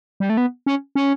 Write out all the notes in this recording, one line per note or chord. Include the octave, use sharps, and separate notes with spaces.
G3
A3
B3
C#4
C#4